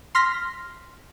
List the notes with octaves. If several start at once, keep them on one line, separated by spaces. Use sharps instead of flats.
C6 F6 A#6 B6